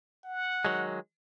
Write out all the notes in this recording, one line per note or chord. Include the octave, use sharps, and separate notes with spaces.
F#5
D#3 F#3 G#3